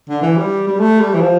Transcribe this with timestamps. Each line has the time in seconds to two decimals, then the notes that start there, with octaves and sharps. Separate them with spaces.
0.09 D3
0.22 E3
0.37 G3
0.67 G3
0.79 A3
1.00 G3
1.14 E3
1.21 F3